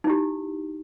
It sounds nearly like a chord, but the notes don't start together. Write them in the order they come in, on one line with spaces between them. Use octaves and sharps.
D#4 E4 G4